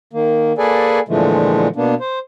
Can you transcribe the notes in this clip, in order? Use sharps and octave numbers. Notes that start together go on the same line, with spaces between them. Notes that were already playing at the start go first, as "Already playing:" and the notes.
D#3 A#3
A#3 G#4 A4 B4 D5 G#5
A#2 D3 E3 F3 G#3 A3
B2 A#3 B3 D4
C5